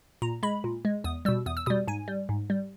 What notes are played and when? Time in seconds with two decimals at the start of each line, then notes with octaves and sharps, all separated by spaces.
0.22 A#2 A#5
0.43 G#3 B5
0.64 A#2
0.85 G#3
1.04 E2 D#6
1.25 G3 E6
1.29 B2
1.46 E2 D#6
1.57 E6
1.66 B2 G3 D#6
1.88 G#2 G#5
2.08 G3
2.29 G#2
2.50 G3